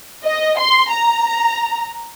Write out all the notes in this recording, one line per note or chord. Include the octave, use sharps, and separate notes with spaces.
D#5
C6
A#5